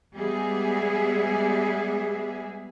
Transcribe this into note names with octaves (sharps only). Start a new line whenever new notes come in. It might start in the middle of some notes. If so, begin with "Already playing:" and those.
G3 G#3 B3 G#4 E5